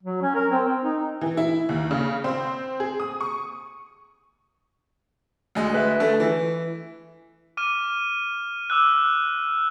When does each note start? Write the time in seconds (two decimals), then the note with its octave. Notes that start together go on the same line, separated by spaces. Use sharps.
0.03 F#3
0.22 C#4
0.35 A#4
0.51 C4
0.66 C4
0.83 D#4
1.21 E3
1.37 E4
1.69 D#2
1.91 C#3
2.24 C4
2.80 G#4
3.00 D#6
3.21 C#6
5.55 D2 G#3
5.74 B4 E5
6.00 D3 A3 A4
6.20 E3
7.57 D6 F6 D#7
8.70 D6 E6 F#6